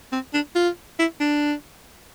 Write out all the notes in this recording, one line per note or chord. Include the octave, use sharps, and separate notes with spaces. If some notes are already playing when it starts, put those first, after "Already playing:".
C4
D4
F4
E4
D4